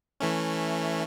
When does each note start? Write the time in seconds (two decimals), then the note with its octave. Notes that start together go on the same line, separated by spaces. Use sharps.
0.20 E3 A3 C#4